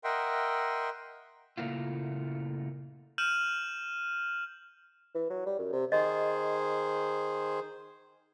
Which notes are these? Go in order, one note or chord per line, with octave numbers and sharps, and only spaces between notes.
A#4 D#5 E5 F#5 G5 C6
A#2 C#3 A3 A#3 E4 F4
F6 G6 D#7 E7 F#7
E3
F#3
G3
F#2
C3
D#3 G#4 C5 D#5